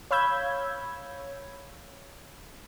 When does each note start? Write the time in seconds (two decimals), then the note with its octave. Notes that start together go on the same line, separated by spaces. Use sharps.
0.11 C#5 F5 B5 E6 G6 G#6